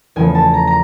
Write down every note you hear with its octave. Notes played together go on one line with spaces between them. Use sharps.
E2 C#3 F3 A3 G#5
A5
A#5
A#5